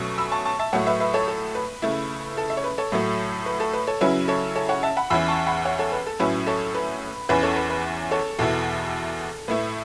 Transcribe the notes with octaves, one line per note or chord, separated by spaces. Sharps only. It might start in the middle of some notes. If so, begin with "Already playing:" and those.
Already playing: B2 F#3 A3 C#4
B5 E6
A5 C#6
A5 C#6
E5 A5
A2 F#3 A3 C#5 F#5
B4 E5
B4 E5
A4 C#5
A4
B4
C#3 A3 E4
A4
E5
C#5
B4
A4 C#5
A2 F#3 A3
B4
A4
B4
A4 C#5
C#3 F#3 C#4 E4 B4
A4 C#5
A4 C#5
C#5 F#5
E5 A5
F#5 B5
E2 E3 C#4 E4 B5 E6
A5 C#6
F#5 B5
C#5 F#5
A4 C#5
B4
A4
A2 F#3 C#4 E4 B4
A4 C#5
B4
E2 E3 C#4 B4
A4 C#5
B4
B4
A4 C#5
E2 B2 B3 E4 A4
A2 A3 E4 B4